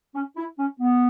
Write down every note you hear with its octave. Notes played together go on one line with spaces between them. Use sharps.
C#4
E4
C#4
B3